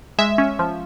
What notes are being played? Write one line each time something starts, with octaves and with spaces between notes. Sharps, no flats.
G#3 E5
C#4
F3